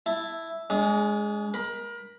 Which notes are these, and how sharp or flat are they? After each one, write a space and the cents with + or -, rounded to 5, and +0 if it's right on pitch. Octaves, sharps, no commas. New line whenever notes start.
E4 +0 A5 +0
G#3 +0 D4 -45
A#4 +25 B5 +0